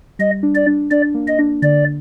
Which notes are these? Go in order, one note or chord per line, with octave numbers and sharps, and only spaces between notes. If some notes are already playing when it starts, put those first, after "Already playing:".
G3 D#5
D4
D5
D4
D4 D5
A#3
D#5
D4
D3 D5